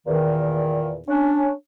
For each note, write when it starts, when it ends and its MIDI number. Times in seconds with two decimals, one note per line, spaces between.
0.07 0.99 40
0.07 0.99 46
0.07 0.99 51
1.08 1.50 61
1.08 1.50 62